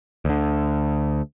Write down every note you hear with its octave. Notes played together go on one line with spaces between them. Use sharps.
D2 D3